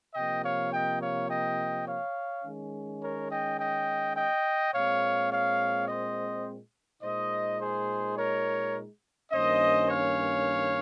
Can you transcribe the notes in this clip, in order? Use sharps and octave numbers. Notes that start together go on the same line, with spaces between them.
C3 F3 A#3 D#5 G5
C#5 F5
D#5 G5
C#5 F5
D#5 G5
C#5 F5
D#3 G#3 C#4
A#4 C#5
D#5 G5
D#5 G5
D#5 G5
A#2 G#3 C4 C#5 F5
C#5 F5
C5 D#5
A#2 G#3 D#4 C5 D#5
G#4 C5
A#4 C#5
G2 D#3 A#3 C#4 C5 D#5
C#5 F5